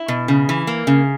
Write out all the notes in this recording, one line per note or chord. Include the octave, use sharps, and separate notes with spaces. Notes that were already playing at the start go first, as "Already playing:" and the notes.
Already playing: E4
B2
C#3
E3
A#3
C#3